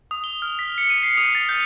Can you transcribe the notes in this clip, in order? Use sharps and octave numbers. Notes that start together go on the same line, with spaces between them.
D#6
G7
F6
B6
C#7
D#7
C7
D#6
A6
G6